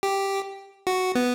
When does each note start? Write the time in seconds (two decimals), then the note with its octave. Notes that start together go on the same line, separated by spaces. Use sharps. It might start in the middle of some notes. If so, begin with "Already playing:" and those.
0.03 G4
0.87 F#4
1.15 B3